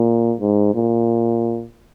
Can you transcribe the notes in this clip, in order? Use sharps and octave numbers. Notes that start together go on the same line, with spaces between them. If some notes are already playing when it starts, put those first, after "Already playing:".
Already playing: A#2
G#2
A#2